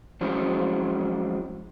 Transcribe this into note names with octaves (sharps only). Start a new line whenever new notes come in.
F3 F#3 G#3 C4 C#4 E4